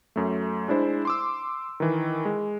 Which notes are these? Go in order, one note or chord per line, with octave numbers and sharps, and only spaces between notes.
F#2 A3
G#3 D4 E4 C5
C6 D6 E6
D#3 E3
G#3